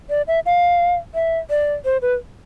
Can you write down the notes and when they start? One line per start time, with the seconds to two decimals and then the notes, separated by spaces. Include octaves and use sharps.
0.10 D5
0.28 E5
0.46 F5
1.15 E5
1.50 D5
1.85 C5
2.02 B4